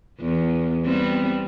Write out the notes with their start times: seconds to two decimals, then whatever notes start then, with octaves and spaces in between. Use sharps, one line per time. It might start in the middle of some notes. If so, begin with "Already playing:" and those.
0.20 E2
0.85 G3 B3 C4